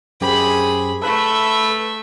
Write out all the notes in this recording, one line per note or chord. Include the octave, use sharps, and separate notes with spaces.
F#2 G4 G#4 C5 B5
A3 A4 B4 E5 B5